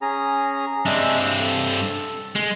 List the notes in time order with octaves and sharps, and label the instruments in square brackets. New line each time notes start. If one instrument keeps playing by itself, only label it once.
[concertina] C#4 G#4 A#5
[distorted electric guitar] G2 C4 [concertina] G#3 D4 E5
[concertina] A4
[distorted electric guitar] G#3